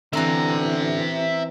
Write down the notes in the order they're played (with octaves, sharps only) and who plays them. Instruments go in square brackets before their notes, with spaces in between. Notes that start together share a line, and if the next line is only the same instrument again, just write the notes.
[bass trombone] D3 [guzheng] E3 C4 [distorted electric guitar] E5 A#5